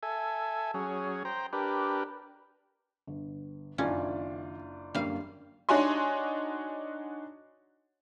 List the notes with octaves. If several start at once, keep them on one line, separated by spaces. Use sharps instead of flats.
A4 E5 G#5
F#3 C#4 G#4
C5 G5 A#5
D4 G4 A#4 B4
G1
F#1 D#3 C#4 D4 F4
F#2 D3 G3 A#3 F5
D4 D#4 F#4 C#5 G#5 C6